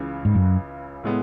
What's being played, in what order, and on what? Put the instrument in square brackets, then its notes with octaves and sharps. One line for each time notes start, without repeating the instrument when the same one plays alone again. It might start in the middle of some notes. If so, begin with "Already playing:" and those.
Already playing: [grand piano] C#2 C#3 E3
[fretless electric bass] G#2
F#2
[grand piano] A2 G#3 B3